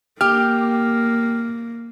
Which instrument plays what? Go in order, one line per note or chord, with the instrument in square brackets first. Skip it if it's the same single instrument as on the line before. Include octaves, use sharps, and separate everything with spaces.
[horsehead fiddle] A#3 [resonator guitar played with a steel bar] G4 [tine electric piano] F6